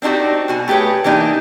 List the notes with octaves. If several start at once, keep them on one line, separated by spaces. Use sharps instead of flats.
C4 D4 D#4 F#4 G4
B2 F#4 G#5
A3 G4 G#4 B4 C#5
E3 A#3 D4 D#4 G4